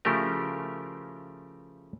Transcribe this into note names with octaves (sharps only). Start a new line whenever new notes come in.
C#3 F3 A3 E4 G4 A#4